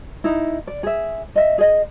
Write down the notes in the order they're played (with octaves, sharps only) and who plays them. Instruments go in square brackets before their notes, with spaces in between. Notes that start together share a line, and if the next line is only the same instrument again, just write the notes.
[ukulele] D#4 E4
D5
G#4 E5
D#5 E5
G#4 D#5